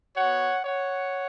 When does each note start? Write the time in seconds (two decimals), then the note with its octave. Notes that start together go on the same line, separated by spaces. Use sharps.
0.17 B3 F#4 C#5 F#5
0.64 C#5 F#5